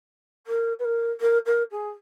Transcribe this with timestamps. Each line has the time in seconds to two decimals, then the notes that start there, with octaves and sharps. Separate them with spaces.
0.47 A#4
0.79 B4
0.84 A#4
1.20 A#4
1.45 A#4
1.71 G#4